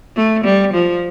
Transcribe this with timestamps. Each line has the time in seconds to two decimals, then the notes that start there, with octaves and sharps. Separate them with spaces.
0.17 A3
0.45 G3
0.74 F3